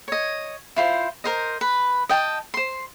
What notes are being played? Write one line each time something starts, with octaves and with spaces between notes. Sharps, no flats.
C#5 D#5
E4 F4 C5
A#4 C5 D#5
B4
D#5 G5 A5
C5 C6